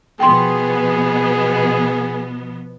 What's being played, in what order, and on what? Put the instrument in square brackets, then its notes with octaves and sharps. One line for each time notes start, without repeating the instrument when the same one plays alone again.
[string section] B2 F3 B3 [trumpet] G#4 [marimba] G5 C6